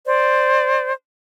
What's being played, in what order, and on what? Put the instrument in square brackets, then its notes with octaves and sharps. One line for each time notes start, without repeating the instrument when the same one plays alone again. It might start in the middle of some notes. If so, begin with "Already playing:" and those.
[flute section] C5 D5